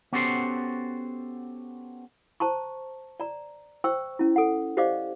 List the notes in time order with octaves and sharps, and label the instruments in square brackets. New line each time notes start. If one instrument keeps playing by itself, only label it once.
[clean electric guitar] B3 C#4 F#4 G4 A4 C5
[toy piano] C5 A5 A#5 C#6
D5 A#5
C5 G5 C#6 E6
C#4 E4
A4 F#5
G4 C5 D5 D#5 F5 D6